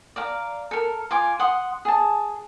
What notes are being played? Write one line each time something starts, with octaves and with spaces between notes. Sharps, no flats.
D5 F5 A#5
A4 A#4
F4 G#5 D6
F#5 C6 D#6
G#4 A5